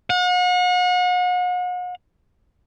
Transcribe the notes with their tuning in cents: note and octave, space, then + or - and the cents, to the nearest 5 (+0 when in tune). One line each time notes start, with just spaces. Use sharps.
F#5 -40